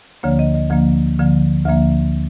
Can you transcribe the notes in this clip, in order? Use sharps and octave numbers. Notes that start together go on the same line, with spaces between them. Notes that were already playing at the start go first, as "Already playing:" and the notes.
D2 D3 F3 A#3 C#5
D#5
D#5
D2 D3 F3 A#3
D2 D3 F3 A#3
D2 D3 F3 A#3 E5